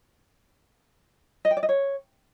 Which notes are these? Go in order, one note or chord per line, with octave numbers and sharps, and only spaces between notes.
D#5
G5
D5
D#5
C#5